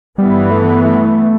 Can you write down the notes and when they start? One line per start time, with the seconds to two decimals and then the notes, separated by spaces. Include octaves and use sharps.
0.18 G2 E3 G3 B3
0.51 A3
0.84 A3